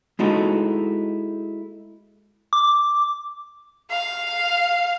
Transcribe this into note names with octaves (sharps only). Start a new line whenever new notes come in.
G#3 A3 D#4 E4 F#4 A4
D6
F5